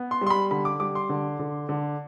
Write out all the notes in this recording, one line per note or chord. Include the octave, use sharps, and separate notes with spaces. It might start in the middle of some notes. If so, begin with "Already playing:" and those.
Already playing: B3
C6
G3
C6
B5
D3 B5
D6
G3 D6
C6
D3
D3
D3